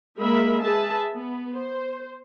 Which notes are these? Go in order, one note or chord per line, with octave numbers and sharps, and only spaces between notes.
G#3 A#3 A#4 E5 B5
G#4 B4 E5 A5
B3
C5